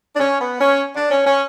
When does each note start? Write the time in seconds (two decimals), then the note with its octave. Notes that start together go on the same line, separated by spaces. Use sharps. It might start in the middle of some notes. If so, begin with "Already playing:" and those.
0.15 D4
0.20 C#4
0.40 B3
0.60 C#4
0.96 D4
1.11 C#4
1.26 C#4